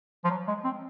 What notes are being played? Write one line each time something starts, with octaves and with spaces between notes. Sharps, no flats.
F3
F#3
G#3
C4